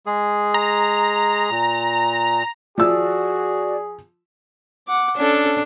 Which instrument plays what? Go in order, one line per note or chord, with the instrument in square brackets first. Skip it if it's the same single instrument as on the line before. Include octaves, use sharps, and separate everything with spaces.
[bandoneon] G#3 G#4
[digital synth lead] A#5
[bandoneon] A#2
[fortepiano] F3 E6 [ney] F#4 [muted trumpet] G#4 [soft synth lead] D5
[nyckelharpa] F#5 D6
[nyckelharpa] C#4 A4 [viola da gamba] D4